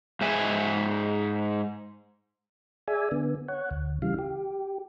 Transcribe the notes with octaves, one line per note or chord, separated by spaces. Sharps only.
G#2 G#3 E5 G#5
G#4 D5 E5 G#5
D3 B3
C#5 F#5
D2
C#3 E3 G3 F5
G4